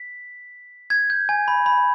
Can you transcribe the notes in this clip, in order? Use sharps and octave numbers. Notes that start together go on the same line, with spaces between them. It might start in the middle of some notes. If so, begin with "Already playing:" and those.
Already playing: B6
G#6
G6
G#5
B5
B5